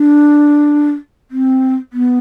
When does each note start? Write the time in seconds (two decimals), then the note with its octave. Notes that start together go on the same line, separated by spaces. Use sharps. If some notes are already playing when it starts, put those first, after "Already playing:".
Already playing: D4
1.31 C4
1.93 B3